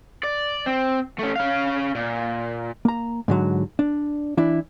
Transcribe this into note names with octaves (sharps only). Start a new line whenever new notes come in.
D5
C4
A3 C#4
C#4 F5
A#2
A#3 A#5
G#2 D3 F#3
D4
E3 D4 E4